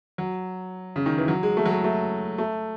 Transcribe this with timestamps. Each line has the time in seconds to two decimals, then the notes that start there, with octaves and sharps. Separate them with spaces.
0.18 F#3
0.96 C#3
1.06 D#3
1.18 E3
1.28 F#3
1.43 G#3
1.57 A3
1.66 F#3
1.71 G#3
1.84 A3
2.38 A3